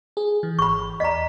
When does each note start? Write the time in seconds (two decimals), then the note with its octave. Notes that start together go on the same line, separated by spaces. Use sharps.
0.17 G#4
0.43 E3
0.59 G#1 B5 C#6
1.00 E2 D5 D#5 A#5 B6